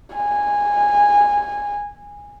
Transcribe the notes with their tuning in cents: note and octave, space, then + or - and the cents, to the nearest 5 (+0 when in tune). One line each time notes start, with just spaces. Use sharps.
G#5 -15